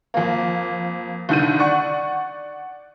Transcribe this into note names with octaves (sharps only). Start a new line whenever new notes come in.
F2 A#3
C2 D3 D#3 G6 D#7
D5 F#5 C#6